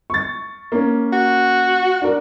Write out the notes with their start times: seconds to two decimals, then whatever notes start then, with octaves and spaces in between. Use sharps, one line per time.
0.10 C#6 A6
0.72 A#3 C#4
1.13 F#4
2.02 D4 A#4